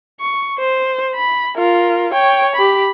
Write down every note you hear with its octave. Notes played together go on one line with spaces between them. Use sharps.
C#6
C5
B5
F4 A#4
C#5 G5
G4 B5